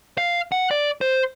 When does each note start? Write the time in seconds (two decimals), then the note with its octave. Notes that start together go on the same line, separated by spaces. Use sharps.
0.18 F5
0.52 F#5
0.71 D5
1.01 C5